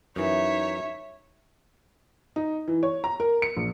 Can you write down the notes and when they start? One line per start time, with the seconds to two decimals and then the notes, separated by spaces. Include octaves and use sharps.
0.16 F#2 E3 D#4 C#5 E5
2.36 D#4
2.68 E3
2.83 C#5
3.04 A#5
3.20 A#4
3.42 C#7
3.57 A#1